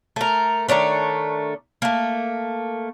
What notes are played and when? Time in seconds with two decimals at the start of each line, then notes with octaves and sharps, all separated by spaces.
0.16 A3 A#4
0.68 D#3 A3 D4 C#5
1.82 A3 A#3